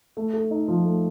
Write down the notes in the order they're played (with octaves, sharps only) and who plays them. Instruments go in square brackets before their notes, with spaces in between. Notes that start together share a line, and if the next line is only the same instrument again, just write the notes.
[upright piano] A3
A4
D#4
F3
A3